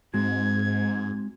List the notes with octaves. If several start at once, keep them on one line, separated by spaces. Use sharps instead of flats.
G#2 G#3 C4 F#4 G#6